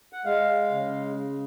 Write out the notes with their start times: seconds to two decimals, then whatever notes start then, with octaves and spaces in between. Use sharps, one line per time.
0.13 F#5
0.25 G#3 F5
0.71 C#3